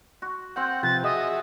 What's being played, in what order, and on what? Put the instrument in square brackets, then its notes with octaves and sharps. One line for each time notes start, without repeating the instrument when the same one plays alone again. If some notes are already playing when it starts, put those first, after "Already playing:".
[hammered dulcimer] F#4
[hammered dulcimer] C4 G5 [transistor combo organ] F#5
[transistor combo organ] C3 F3 [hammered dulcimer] B4 [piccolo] A6
[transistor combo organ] F#4 G#4 E5 [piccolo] D#5